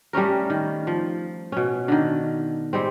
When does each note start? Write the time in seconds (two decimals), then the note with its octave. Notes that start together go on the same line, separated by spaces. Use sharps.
0.13 G3 A3 C#4 A#4
0.50 D#3
0.87 F3
1.52 B2 C#4
1.88 D3 D#3
2.73 G3 G#3 C4